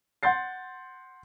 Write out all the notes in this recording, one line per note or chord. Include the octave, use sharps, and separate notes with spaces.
F#5 C6 G6 A6 C7